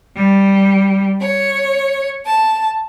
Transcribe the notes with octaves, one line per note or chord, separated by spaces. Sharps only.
G3
C#5
A5